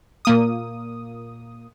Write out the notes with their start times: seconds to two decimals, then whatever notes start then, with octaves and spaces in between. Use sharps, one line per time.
0.25 A#2 A#3 D#6